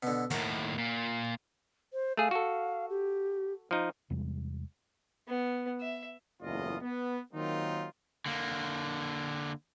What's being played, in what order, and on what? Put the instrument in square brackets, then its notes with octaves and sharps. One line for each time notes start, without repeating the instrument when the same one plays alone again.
[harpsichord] B2 D3
[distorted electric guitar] D#2 A2 [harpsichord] F#4 A#4
[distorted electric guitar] A#2
[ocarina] C5
[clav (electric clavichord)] A3 G#4 [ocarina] F5
[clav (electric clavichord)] F#4 A4
[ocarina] G4
[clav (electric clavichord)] F3 D#4
[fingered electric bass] E2 C3 G3 G#3
[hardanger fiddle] B3
E5
[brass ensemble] F#1 E2 A2 F4 D#5
B3
D#3 F#3 A#3 C4 D#4 F4
[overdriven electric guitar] D3 A#3